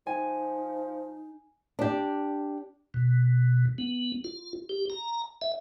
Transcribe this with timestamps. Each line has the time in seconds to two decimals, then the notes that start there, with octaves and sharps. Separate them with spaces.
0.07 F3 D#4 G#5
1.79 D4 G4
2.94 B2
3.78 B3
4.24 F4
4.69 G4
4.90 A#5
5.42 E5